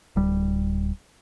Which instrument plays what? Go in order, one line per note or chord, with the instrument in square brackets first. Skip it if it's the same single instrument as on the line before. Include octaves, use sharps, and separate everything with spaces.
[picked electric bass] D1 G3